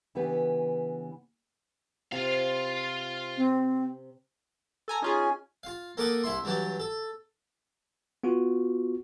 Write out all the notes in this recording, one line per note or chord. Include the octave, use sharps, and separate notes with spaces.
C#3 E3 B3 D4 G4 B4
C3 F4 F5
C4
A4 G#5 A#5
C#4 D#4 F4 G#4 G#5
F4 F5
A#3 A4 A#4 F#5 D6 D#6
C2 E4 E5 C6
G2 E3 F#3 G4 A5
A4
B3 F4 F#4